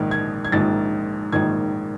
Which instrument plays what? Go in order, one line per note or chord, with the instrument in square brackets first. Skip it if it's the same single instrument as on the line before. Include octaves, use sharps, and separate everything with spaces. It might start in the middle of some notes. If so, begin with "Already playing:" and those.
Already playing: [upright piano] A#1 G#2 D#3
G#6
G#6
A#1 G#2 D#3 A6
A#1 G#2 D#3 G#6